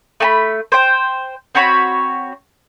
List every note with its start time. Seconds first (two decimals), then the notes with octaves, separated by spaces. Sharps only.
0.20 A3 A5 B5
0.72 C5 G5
1.55 C4 F#4 C#5 B5